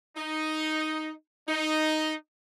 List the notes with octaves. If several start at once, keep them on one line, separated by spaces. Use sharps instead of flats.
D#4
D#4